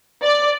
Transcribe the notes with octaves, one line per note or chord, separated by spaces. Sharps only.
D5